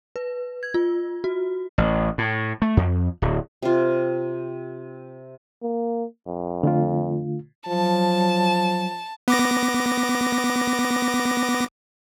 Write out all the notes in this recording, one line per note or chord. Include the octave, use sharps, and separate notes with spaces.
B4
G#6
F4
F#4
A1
A2
A3
F2
D1
C3 F4
A#3
F2
D3 A3 F4
F3 F#3 A5
B3 D6 A#6